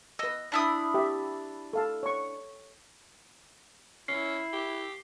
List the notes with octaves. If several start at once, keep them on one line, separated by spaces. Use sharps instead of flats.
B4 D#5 E6
D4 E4 D#6
G4 E5
A4 F5 A5
C#5 C#6
C#4 E4 C7
G4